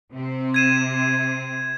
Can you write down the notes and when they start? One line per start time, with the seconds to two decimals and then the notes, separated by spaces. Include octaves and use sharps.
0.12 C3 C4
0.54 G#6 D#7 E7